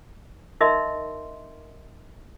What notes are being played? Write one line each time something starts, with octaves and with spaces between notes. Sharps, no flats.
D#4 A#4 D#5 E5 C6